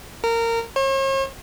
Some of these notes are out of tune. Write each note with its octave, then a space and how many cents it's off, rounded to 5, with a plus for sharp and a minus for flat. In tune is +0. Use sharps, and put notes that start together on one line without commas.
A#4 -20
C#5 -45